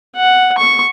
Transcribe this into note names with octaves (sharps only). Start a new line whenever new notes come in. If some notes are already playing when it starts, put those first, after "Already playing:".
F#5
C#6